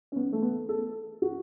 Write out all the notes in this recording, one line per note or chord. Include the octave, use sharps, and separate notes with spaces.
C#4
B3
A3
B3
A4
F#4